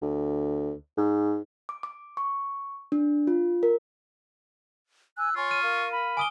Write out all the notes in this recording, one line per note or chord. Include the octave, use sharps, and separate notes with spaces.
D2
G#2
D6
D6
C#6
D4
F4
A#4
G#5 E6 F#6
F4 C#5 G#5 C6 C#6
F6 D#7
A#4 F5
B5
G#5 D6 D#6 G7